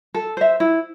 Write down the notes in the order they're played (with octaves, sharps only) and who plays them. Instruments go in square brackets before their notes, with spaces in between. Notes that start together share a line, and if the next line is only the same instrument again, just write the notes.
[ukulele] A4
C5 E5
E4